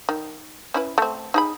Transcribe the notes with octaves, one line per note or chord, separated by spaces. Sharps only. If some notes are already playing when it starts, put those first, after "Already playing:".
D#3
C#4 E4 B4
A3 C4
D#4 G#4 B5